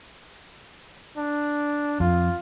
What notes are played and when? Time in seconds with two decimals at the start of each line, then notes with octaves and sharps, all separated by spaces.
1.17 D4
2.00 F2 F4